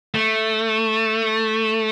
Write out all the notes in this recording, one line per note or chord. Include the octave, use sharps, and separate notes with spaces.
A3